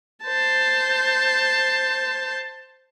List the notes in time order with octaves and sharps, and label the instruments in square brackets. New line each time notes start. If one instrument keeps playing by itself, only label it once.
[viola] C5 A5